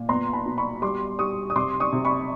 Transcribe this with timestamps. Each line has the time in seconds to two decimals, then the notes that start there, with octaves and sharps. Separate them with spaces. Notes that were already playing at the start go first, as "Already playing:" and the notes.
Already playing: A#2
0.09 B3 A#5 C6
0.33 A5 B5
0.46 B2
0.57 B5 C#6
0.82 G3 C6 D6
1.19 G3 C#6 D#6
1.50 D#6
1.55 C3 C6 D6
1.80 C#6 D#6
1.92 C3
2.05 B5 C#6